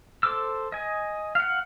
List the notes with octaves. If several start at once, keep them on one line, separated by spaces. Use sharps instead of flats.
A4 C5 D6 E6
D#5 G#5
F5 F#5